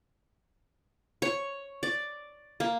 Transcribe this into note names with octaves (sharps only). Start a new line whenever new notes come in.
C#5
D5
A#3